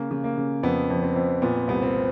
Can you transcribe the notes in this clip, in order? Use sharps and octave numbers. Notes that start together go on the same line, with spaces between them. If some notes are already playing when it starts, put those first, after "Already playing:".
Already playing: C#3 A#3
C#3
A#3
C#3
F2 B3
F2
C4
F2
A#2 B3
C4
C2 B3
C4